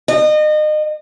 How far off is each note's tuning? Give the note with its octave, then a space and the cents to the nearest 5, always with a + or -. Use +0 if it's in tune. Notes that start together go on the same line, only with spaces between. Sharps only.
D#5 -30